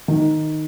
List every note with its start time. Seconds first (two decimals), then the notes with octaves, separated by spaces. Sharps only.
0.08 D#3